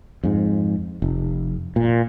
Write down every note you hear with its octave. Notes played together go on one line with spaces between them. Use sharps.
F2 G#2
F1
A#2